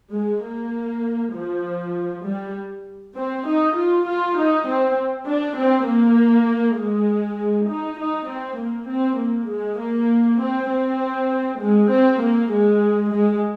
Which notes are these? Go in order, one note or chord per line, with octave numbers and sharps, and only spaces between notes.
G#3
A#3
F3
G3
C4
D#4
F4
F4
D#4
C4
D4
C4
A#3
G#3
D#4
D#4
C4
A#3
C4
A#3
G#3
A#3
C4
C4
G#3
C4
A#3
G#3
G#3